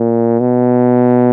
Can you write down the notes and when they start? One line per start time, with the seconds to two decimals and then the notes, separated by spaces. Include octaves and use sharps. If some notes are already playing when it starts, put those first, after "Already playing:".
Already playing: A#2
0.40 B2